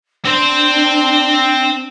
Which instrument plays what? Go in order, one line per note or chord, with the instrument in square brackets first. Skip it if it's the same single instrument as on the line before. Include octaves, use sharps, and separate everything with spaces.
[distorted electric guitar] C4 C5 [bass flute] D4